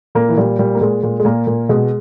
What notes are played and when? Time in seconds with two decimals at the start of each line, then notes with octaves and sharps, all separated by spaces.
0.15 A#2 A#3
0.29 E3
0.37 A#2 G3
0.59 A#2 G3
0.75 A#3
0.81 A#2 G#3
1.03 A#2
1.20 G#3
1.25 A#2 A#3
1.47 A#2
1.69 B2 G#3